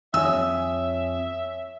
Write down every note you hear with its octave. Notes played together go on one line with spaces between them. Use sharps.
F2 C#5 E5 G#5 D#6 E6